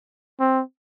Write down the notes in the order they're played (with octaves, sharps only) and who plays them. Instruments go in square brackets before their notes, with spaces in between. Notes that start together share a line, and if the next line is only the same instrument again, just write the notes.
[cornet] C4